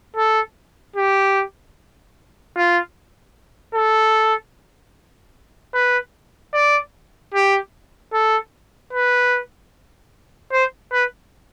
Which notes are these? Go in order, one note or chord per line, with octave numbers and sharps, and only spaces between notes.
A4
G4
F4
A4
B4
D5
G4
A4
B4
C5
B4